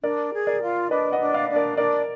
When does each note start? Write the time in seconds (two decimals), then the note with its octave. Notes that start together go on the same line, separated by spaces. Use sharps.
0.03 D4 A#4 D5
0.33 G#4
0.47 A#4 D5
0.61 F4
0.91 D4 B4 D#5
1.12 D#5 F#5
1.20 D4
1.34 D5 F5
1.49 D4
1.56 A#4 D5
1.77 D4 A#4 D5